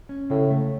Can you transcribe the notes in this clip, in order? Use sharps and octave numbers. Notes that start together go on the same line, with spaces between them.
C#4
A2 C#3
A3